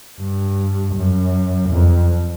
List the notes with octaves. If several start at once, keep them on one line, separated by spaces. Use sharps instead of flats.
G2
F#2
F2